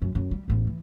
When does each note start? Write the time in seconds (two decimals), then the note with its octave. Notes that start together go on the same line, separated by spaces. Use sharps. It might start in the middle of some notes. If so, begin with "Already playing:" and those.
0.02 F#2
0.15 F#2
0.31 G3
0.48 A1 E2
0.67 E3